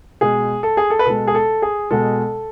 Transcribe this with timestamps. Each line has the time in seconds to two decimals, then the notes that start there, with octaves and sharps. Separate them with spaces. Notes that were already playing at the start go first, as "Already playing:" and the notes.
0.21 B2 G#3 G#4
0.63 A4
0.77 G#4
0.90 A4
0.99 B4
1.06 B2 G#3 A4
1.27 G#4
1.35 A4
1.62 G#4
1.91 B2 G#3 A4